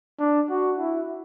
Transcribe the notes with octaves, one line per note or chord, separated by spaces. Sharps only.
D4
F#4
E4